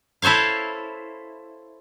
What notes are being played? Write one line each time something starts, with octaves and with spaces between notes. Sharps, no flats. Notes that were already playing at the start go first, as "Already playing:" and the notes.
E4 A4 C5 C#5 F5